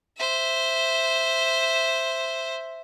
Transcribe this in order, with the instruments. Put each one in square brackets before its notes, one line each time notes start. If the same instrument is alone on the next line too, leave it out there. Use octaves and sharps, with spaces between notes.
[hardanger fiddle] C5 E5